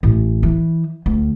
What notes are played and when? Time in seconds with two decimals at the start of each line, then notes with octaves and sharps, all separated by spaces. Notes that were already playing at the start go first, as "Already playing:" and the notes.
0.03 A1
0.43 E3
1.06 D2